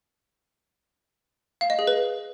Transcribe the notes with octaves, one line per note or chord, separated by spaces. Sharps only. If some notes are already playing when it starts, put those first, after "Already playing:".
F5
D#5
G#4
B4